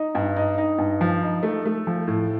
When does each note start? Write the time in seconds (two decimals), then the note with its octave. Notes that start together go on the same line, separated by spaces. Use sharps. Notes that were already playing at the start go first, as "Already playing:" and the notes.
Already playing: D#4
0.15 G2
0.36 D#4
0.58 D#4
0.78 G2
1.01 F3
1.22 D#4
1.43 A3
1.65 A3
1.87 F3
2.08 A2